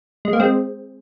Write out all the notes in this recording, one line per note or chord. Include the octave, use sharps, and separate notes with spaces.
G#3
A#3
G#3 C4